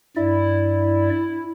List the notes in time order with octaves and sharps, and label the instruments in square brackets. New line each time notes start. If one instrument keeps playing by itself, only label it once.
[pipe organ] G2 D5 [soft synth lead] E4